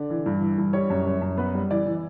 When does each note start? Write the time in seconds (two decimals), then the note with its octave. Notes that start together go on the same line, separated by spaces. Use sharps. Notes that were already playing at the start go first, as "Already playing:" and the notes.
Already playing: D3 D5
0.10 E3
0.26 G2
0.41 E3
0.58 G2
0.73 G3 C#5
0.90 F#2
1.06 F#2
1.21 F#2
1.37 B3 B4
1.54 G3
1.71 E3 D5
1.86 E3